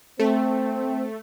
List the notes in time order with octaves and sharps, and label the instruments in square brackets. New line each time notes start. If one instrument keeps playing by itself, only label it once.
[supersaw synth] A3 [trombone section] C4